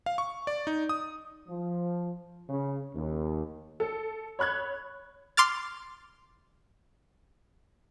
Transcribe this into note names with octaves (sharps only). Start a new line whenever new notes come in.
F5
C#6
D5
D#4
D#6
F3
C#3
D#2
A4
C#5 B5 F#6 G#6
C6 D6 F6 A6